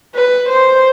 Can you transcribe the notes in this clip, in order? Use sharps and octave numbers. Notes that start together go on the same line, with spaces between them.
B4
C5